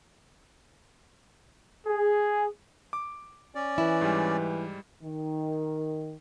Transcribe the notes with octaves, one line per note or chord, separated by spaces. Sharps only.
G#4
D6
C#4 D5
E3 E4
G#2 G3
D#3